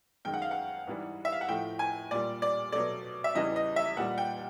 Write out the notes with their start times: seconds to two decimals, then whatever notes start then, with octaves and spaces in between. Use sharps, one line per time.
0.25 F#2 D#3 G#3 G5
0.34 F#5
0.42 F5
0.51 F#5
0.87 G#2 E3 G3
1.25 E5
1.32 F5
1.41 F#5
1.48 A2 F3 A3 G5
1.79 G#5
2.11 A#2 G3 D5
2.42 D5
2.72 B2 F#3 A3 D5
3.24 E5
3.35 E2 C#3 E3 G3 D#5
3.56 D#5
3.76 E5
3.97 A#2 G3 F#5
4.18 G5